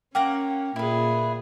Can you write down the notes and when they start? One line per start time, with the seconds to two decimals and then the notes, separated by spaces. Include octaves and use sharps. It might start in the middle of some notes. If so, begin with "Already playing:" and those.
0.15 A#3 C#4 F#5 G5 A#5
0.76 A#2 E4 G#4 B4